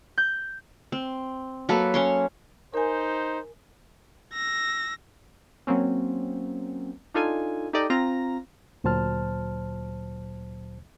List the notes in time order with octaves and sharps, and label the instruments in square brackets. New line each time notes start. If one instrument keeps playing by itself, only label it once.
[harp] G6
[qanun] C4
F#3 A#3 A4 B4
C#4 C#5 C6
[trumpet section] D#4 C5 [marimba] A#4 G#5
[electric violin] E6 A#6
[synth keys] F#3 A#3 C4 C#4
D4 D#4 F4 A4 G#5
D#4 G4 A4 D5 D#5
C4 F4 A#5 A#6
[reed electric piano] D2 A#2 F#3 C5 A5 F6